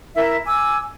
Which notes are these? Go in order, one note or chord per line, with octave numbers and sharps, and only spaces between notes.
E4 A#4 E5
G#5 D6 E6